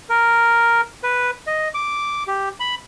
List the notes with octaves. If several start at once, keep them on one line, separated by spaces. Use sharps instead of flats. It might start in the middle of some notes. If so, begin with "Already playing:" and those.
A#4
B4
D#5
D6
G4
B5